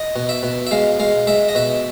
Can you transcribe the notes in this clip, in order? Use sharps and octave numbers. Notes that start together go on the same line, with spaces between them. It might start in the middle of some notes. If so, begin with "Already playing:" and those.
Already playing: D#5
B2
E5
B2
E5
G#3 F5
G#3 F5
G#3 E5
D#5
B2 E5